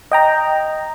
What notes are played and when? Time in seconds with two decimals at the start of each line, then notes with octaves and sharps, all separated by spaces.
0.12 D#5 G5 A#5